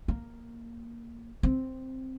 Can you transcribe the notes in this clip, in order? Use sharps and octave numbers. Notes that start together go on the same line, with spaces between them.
A#3
C4